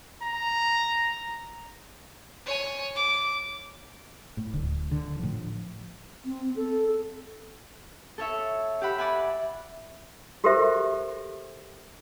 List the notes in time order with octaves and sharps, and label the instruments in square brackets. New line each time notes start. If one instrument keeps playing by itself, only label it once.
[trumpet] A#5
[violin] C#5 G#5
D6
[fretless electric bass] A2
D1 D2
D3
A2 F3
[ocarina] C4
A4
[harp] A4 C#5 E5
G4 E5 F#5 B5
D5 F#5 G#5 B5
[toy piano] F#4 G4 A4 A#4 C5 E5